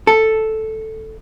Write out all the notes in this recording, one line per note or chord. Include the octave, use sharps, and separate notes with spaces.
A4